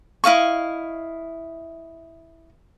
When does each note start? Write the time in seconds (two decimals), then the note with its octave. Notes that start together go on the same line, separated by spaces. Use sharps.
0.24 E4 D#5 F5 C#6